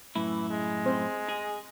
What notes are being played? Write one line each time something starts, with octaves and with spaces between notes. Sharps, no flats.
F#2 A2 E3 E4
G#3
C4 C5
G#4